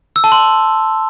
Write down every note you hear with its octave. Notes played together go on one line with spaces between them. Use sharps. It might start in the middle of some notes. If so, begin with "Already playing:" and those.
E6
A5
C6